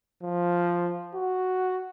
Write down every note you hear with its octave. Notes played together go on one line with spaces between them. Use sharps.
F3
F#4